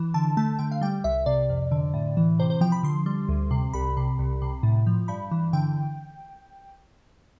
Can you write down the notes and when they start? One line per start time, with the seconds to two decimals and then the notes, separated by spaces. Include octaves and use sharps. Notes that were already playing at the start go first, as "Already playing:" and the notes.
Already playing: E3
0.14 D3 A5
0.37 A3 A5
0.59 D3 G5
0.71 F5
0.81 G3 G5
1.04 C2 E5
1.26 C3 D5
1.50 F2
1.71 D3
1.94 A2
2.17 E3
2.39 C3 C5
2.50 C5
2.61 F3 G5
2.72 B5
2.83 D3 C6
3.06 G3
3.29 D2
3.51 C3
3.73 C2 B5
3.97 C3
4.19 C2
4.42 C3
4.63 A2
4.87 F3
5.08 G2 B5
5.31 E3
5.53 D3 G5